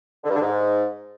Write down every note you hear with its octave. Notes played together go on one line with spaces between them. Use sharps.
D3
G2
D3
G#2